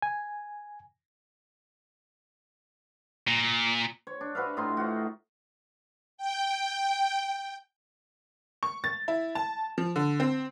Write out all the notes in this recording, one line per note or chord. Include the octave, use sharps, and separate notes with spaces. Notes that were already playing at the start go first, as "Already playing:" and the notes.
G#5
A#2
C#5
D4
F#4 B4 E5 F5
A2 D#4 F4 C6
F4 F#4
G5
C#6
A6
E4
A5
F3
D3
C4